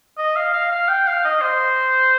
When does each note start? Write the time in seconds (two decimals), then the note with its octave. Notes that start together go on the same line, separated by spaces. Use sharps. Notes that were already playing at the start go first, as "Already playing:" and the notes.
0.18 D#5
0.36 F5
0.53 F5
0.72 F5
0.88 G5
1.07 F5
1.25 D#5
1.41 C5